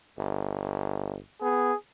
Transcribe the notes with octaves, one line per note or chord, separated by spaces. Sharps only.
G1
B3 G#4